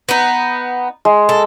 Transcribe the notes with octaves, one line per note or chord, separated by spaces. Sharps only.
B3 D#4
G#3
A4